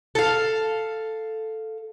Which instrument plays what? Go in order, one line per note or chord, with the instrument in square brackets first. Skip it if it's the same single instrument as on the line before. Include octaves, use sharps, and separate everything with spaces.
[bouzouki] A4 F5